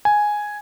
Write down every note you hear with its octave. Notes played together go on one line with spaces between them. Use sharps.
G#5